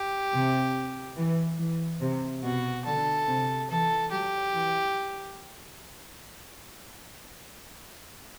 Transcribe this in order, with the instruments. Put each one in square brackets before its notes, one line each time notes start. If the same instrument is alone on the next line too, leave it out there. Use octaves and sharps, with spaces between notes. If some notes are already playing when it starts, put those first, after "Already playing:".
Already playing: [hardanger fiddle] G4
[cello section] C3
E3
E3
C3
[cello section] B2 [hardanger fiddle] F#4
[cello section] D3 [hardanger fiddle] A4
[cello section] C3
[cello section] E3 [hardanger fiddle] A4
[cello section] F#3 [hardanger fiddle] G4
[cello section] E3